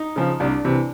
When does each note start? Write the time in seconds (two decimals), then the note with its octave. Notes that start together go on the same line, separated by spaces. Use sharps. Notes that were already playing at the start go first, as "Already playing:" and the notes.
Already playing: D#4
0.16 C#3 F3
0.40 C2 D4
0.64 C3 E3